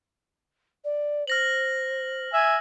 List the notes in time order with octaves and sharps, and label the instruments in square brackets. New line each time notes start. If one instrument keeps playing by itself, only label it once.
[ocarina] D5
[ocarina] C5 [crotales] F6 A#6 F#7
[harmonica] E5 G#5